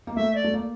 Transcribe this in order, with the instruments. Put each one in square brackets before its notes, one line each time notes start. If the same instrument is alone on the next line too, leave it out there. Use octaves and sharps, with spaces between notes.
[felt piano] A#3
[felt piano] A3 [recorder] E5
[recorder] D5
[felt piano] A3
A#3